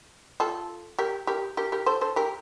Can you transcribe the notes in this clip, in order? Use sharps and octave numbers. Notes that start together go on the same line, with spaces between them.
F4 A4
G4 A#4
G4 A#4
G4 A#4
G4 A#4
A4 C5
A4 C5
G4 A#4